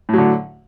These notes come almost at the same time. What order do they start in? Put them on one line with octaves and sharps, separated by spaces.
A2 F#3 D3